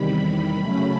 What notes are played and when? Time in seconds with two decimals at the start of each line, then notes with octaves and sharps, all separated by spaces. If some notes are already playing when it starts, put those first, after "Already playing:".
Already playing: E2 C3 D#3 G3 B5
0.55 C#3 F#3 A3 C#4 B5